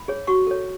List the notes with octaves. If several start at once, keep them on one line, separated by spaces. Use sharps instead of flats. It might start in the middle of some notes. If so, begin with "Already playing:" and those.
Already playing: B5
G#4 C#5
F#4 C#6
A4 C#5